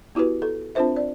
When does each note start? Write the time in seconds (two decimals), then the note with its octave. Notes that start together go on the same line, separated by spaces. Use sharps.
0.15 B3 E4 F#4 G4 B4
0.42 A4
0.75 C4 D4 F4 A#4 C5 E5
0.96 D5